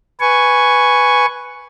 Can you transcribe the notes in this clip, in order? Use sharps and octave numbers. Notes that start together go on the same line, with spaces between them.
B4 G#5 C#6